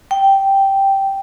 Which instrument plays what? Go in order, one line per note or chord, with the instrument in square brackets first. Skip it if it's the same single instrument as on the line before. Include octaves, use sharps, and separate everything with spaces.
[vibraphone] G5